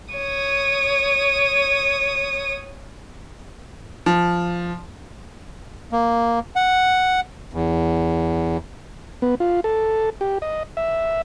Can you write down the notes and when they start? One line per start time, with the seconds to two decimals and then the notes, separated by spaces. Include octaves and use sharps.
0.14 C#5 D#6
4.06 F3
5.92 A#3
6.56 F#5
7.53 E2
9.22 B3
9.40 F4
9.64 A4
10.21 G4
10.42 D#5
10.77 E5